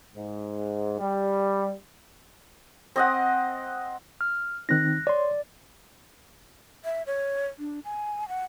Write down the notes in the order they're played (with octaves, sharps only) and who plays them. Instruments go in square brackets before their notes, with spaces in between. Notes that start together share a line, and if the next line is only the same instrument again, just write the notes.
[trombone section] G#2
G3
[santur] C4 D#5 F#5
[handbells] F6
[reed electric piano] D#3 C4 D#4 [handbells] F#6 A#6
[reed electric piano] C#5 C6 [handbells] D5
[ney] E5
C#5
D4
G#5
F#5